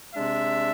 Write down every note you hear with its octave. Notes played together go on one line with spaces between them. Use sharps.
C3 G#3 D4 E5